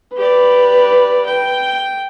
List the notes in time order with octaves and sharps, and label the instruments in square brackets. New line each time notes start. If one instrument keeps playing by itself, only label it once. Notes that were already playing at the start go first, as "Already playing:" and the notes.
[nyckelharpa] G4 D5 [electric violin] B4
[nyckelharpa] G5